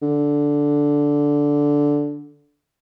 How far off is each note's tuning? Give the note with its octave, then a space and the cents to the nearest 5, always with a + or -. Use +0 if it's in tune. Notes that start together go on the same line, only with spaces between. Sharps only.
D3 -10